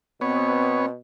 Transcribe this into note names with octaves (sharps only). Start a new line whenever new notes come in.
B2 B3 C4 C#5